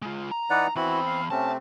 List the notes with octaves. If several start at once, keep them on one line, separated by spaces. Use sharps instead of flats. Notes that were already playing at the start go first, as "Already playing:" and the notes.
G#3 F4
A#5
E3 D#4 B4 D5 F#5
E2 E3 C4 E4 F#4 B5
F5
C3 A3 C4 C#4 A5